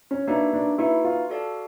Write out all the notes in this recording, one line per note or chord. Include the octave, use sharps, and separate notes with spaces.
C#4
A#3 D4 D#4 F#4 B4 E5
D4
A#3 D#4 E4 F#4 B4 E5
F4
F#4 A4 D5 F5 A5